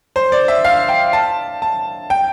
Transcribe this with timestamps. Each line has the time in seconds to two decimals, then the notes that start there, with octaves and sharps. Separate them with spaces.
0.16 C5
0.32 D5
0.48 E5
0.64 F5
0.89 G5
1.13 A5
1.62 A5
2.10 G5